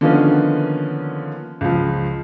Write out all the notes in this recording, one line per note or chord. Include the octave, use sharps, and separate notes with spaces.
D3 D#3 F3 A#3 B3 C#4
C#2 F3